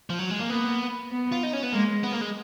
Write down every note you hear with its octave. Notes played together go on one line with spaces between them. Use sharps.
F3
F#3
G#3
A#3
A#3 B3
B3
F4
D#4
C#4
B3
G#3 A#3
B3
A#3
G#3